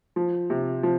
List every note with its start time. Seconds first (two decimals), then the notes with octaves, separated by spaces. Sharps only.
0.16 F3
0.50 C3
0.83 F3